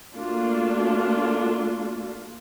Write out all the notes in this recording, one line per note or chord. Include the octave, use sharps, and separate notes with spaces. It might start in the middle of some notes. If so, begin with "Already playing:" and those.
A3 A#3 D4 F4 F#4